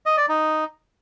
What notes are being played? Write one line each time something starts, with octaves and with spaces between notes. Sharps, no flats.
D#5
D5
D#4